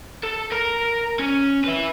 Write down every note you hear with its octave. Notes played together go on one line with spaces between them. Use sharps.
A4
A#4 A#5
C#4
E4 B4